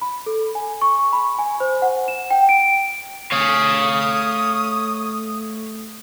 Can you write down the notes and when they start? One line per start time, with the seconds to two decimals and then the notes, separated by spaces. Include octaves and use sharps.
0.01 B5
0.26 A4
0.55 G#5
0.81 C#6
1.13 B5
1.39 G#5
1.60 C5
1.82 F#5
2.08 E7
2.31 G5
2.49 D7
3.32 A3 C#5 F5 D#6